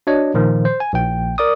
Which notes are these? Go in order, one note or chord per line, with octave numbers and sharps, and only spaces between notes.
D4 F#4 C#5 D#5
A#2 D#3 F3
C5
G#5
A#1 G5
A#4 D5 D6 D#6